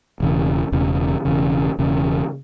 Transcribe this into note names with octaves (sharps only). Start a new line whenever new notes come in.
E1 E2 C#3
E1 E2 C#3
E1 E2 C#3
E1 E2 C#3